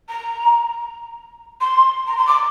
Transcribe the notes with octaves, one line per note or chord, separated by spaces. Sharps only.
A#5
C6
A#5
C6
D6